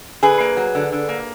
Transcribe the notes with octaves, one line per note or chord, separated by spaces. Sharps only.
D3 G#4 B4
A#3
F#3
D3
D3
A#3